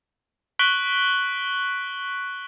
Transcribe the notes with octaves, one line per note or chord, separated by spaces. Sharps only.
C#6 F#6 B6 D7 F#7 G7